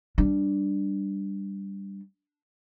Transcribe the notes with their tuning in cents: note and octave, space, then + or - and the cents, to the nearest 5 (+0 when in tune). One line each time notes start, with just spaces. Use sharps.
G3 +0 D4 +0